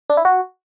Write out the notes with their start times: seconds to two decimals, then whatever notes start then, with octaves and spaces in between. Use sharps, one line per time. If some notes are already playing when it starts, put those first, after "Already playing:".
0.10 D4
0.17 E4
0.25 F#4